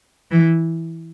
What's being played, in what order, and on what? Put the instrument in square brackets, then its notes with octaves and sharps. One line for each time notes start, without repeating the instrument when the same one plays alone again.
[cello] E3